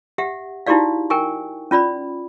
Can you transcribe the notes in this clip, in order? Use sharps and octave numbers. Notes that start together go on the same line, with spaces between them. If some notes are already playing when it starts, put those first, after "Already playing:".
G4 E5 F#5
D#4 E4 F#4 G4 D5 F5
A#4 G5 G#5 C#6
C#4 F4 D5 B5